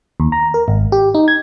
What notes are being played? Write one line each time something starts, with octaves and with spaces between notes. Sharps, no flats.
D#2
A#5
A#4
G#1
G4
D#4
G#6